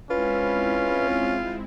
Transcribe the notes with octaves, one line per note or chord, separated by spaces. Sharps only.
G#3 C4 C#4 E4 F4 B4